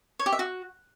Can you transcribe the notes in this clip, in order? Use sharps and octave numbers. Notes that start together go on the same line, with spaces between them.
C#5
G4
E5
F#4